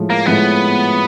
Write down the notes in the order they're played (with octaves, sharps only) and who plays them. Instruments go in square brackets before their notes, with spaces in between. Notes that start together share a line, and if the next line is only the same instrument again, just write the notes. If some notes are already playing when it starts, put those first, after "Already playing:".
Already playing: [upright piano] A2 F3 G#3
[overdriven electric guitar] A#3
[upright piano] A2 F3 G#3 [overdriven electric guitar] B3